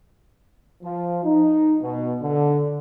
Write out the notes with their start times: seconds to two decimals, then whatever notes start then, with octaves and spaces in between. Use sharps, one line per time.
0.83 F3
1.24 D#4
1.81 B2
2.22 D3